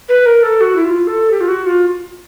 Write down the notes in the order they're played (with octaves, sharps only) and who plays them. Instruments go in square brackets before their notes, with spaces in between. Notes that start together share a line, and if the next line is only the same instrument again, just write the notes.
[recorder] B4
A#4
A4
F#4
E4
F4
A4
G4
F4
F#4
F4